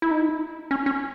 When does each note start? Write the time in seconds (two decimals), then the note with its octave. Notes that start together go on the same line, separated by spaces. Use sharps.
0.02 E4
0.11 D#4
0.71 C#4
0.86 C#4